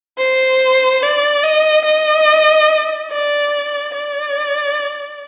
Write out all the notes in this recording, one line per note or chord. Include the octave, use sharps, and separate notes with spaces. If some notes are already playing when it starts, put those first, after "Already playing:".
C5
D5
D#5
D#5
D5
D5